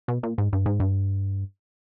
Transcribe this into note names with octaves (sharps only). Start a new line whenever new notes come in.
B2
A#2
G#2
G2
G#2
G2